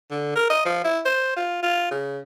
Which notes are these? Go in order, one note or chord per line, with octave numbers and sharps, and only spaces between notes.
D3
A#4
D#5
F3
E4
C5
F4
F4
C#3